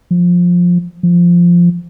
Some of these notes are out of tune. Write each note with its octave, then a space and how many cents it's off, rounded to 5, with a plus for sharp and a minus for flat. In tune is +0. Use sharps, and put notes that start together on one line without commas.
F3 +15
F3 -5